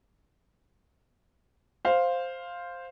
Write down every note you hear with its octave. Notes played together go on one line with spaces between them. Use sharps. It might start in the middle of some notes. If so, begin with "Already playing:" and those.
C5 F5